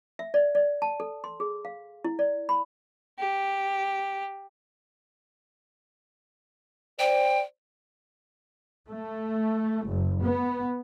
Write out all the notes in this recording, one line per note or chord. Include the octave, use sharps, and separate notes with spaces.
E5
D5
D5
A5
A4
C6
G#4
F5
E4
D5
B5
G4
C5 D5 G5
A3
F#1
B3